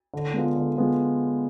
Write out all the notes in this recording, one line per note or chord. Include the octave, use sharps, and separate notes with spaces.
D3
G#3 B3 F4
D3
G#3 B3 F4